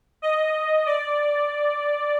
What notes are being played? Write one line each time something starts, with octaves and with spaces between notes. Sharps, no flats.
D#5
D5